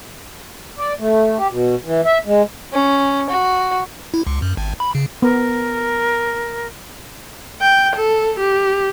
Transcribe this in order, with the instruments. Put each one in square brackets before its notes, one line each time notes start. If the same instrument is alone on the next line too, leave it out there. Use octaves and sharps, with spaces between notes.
[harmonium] D5
A3
G4
B2
E3
E5
G#3
[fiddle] C#4
F#4
[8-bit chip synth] E4
C#2
F#2
G#1
B5
C#3
[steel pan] B3 [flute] A#4
[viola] G5
A4
G4